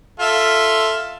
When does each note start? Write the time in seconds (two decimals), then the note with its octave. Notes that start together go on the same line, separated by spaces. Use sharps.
0.19 F4 A4 E5